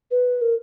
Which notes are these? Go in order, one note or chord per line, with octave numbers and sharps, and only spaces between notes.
B4
A#4